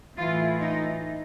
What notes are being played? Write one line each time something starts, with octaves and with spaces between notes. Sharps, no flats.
A2 E3 F4
D#4